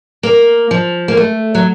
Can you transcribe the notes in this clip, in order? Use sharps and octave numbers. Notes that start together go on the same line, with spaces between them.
A#3
F3
A#3
A3
F#3